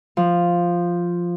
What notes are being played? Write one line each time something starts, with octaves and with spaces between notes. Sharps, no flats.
F3